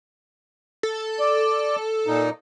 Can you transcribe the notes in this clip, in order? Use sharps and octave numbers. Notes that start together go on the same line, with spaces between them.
A4
D5
A#2 D#4